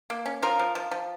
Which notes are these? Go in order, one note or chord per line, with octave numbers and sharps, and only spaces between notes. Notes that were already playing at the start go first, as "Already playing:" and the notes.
A#3
C#4
F3 F4 A#4
F3
F3
F3